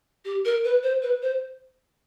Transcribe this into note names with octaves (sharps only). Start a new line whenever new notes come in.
G4
A#4
B4
C5
B4
C5